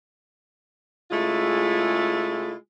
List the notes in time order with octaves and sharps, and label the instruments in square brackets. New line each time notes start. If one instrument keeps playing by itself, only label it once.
[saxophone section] C#3 G#3 A3 E4 F4